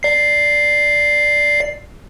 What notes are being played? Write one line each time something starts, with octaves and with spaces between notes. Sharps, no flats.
D5 C7